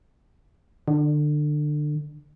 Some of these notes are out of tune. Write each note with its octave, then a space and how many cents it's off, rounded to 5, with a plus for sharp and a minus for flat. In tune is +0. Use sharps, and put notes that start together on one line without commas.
D3 +25